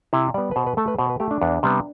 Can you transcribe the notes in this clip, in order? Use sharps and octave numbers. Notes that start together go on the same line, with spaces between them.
C3 E4
G3 B3 D5
B4
B2 C5
B4
A3 A4
B4
B2 C5
B4
A3 G4
D4
E2
C3 G3 B3